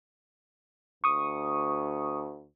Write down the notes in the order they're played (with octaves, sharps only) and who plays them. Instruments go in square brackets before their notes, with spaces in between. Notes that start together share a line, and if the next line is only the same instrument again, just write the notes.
[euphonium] D2 [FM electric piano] C#6 D#6